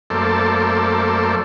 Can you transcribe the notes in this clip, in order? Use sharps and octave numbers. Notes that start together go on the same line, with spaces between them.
F#2 A3 A#3 A4 C5 D5